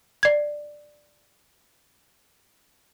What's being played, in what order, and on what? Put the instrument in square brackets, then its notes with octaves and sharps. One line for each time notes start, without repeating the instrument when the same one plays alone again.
[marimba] D5 G#6